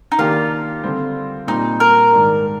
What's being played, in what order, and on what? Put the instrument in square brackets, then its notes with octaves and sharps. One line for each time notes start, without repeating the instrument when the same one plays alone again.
[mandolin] D#4
[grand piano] D#3 A#3 D4 G4 [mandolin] F4
[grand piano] D3 G3 C4
[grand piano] A#2 G3 C4 [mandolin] D#4
[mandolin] A#4
[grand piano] G#2 D#3 G#3 D4